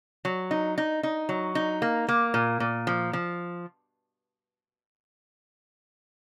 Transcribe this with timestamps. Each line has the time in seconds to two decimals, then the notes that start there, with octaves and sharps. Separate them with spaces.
0.25 F#3
0.51 D#4
0.78 D#4
1.03 D#4
1.29 F#3
1.55 D#4
1.82 A#3
2.09 A#3
2.34 A#2
2.60 A#2
2.87 F3
3.13 F3